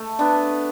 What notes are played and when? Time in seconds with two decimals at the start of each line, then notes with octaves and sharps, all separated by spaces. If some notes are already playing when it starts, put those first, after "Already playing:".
Already playing: A3
0.19 B3 D4